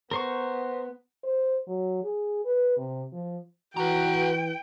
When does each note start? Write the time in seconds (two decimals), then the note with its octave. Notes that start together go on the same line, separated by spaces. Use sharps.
0.11 B3 A#4 C5 C#6
1.24 C5
1.68 F#3
2.04 G#4
2.45 B4
2.77 C3
3.12 F3
3.77 E3 F#4 B4 G5 A#5